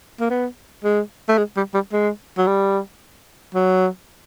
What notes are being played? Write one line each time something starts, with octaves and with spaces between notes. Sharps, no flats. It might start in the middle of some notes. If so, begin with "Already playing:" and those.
A#3
B3
G#3
A3
G#3
G3
G3
G#3
F#3
G3
F#3